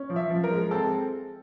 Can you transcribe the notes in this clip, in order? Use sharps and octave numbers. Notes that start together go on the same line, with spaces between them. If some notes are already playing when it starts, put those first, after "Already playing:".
Already playing: C#4
F3
E5
F3
A#4
G#3
C4 A4